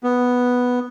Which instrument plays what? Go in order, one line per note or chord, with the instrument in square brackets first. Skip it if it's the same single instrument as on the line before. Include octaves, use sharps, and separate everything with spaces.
[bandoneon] B3